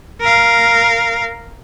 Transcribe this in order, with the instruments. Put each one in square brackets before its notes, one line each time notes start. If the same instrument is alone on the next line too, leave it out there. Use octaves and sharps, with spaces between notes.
[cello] A#4 F5